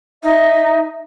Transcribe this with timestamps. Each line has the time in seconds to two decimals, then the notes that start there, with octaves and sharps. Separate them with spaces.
0.23 D#4 E5